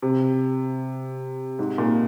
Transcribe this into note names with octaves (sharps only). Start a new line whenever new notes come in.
C3
G#2
A#2